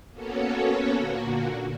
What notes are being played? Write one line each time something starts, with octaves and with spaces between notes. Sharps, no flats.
A#3 B3 C#4 F#4 A4 C#5
A#2 D3 A#3 F#4